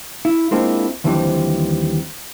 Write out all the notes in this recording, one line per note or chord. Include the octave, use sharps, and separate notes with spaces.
E4
G#3 A#3 C4 D4 E4 F4
D#2 D3 E3 F3 G3 C4